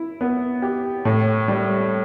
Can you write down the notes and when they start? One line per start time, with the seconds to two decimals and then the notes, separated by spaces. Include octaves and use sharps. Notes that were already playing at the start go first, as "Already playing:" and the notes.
Already playing: E4
0.21 B3
0.62 G4
1.05 A2
1.48 G3